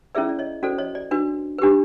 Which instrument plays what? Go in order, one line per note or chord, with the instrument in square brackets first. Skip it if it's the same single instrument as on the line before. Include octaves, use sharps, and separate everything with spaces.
[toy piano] C#4 E4 G#4 B4 D5 E5
D5
C#5 D#5
C#4 F#4 A4 C5 D5
C#5 D#5
D5
D4 F#4 B4
D4 G4 B4